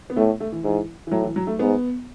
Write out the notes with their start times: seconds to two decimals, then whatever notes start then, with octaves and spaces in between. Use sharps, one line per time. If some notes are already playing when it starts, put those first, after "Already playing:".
0.10 B3
0.16 A2 A3
0.40 A3
0.52 E3
0.64 G#2 E3
1.07 E3
1.11 A2 F#3
1.24 E3
1.36 F#3
1.47 A3
1.59 G#2 B3